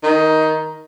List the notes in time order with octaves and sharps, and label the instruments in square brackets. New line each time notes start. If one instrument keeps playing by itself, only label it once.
[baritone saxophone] D#3